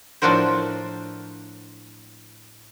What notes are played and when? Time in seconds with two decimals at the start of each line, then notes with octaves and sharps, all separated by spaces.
0.22 A2 F3 D4 F#4 A#4 C5